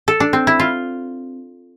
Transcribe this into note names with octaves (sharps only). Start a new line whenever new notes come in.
A4
D4
C4
E4
F4